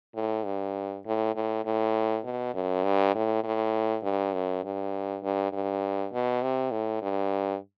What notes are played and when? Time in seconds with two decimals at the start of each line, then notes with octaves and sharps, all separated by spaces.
0.15 A2
0.45 G2
1.06 A2
1.36 A2
1.65 A2
2.24 B2
2.54 F#2
2.84 G2
3.15 A2
3.44 A2
4.03 G2
4.33 F#2
4.64 G2
5.23 G2
5.53 G2
6.13 B2
6.43 C3
6.72 A2
7.02 G2